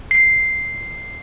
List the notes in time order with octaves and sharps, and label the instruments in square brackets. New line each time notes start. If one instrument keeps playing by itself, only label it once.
[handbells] C7